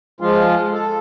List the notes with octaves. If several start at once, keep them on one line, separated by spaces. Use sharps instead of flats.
F3 G#3 F4
A4